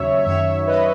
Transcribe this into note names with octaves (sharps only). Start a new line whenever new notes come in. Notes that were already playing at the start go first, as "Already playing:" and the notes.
Already playing: D#2 C#3 F#3 C#5 E5
F#2 D#3 F#3 C#5 E5
B4 D#5